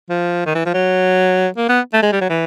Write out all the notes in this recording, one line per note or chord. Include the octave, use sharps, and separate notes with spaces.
F3
D#3
E3
F3
F#3
A#3
B3
A3
G#3
G3
F#3
E3